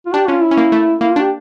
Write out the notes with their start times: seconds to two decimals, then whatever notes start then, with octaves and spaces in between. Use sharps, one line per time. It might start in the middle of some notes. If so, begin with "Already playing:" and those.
0.06 F4
0.14 D4 G4
0.28 C#4 F4
0.42 E4
0.51 C#4
0.57 A#3
0.72 A3
1.01 A#3 E4
1.11 F4
1.16 D4 G4